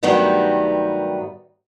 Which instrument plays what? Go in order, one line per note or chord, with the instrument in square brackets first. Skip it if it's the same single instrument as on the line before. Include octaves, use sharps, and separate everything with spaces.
[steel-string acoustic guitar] G2 D#3 F#3 G3 A3 B3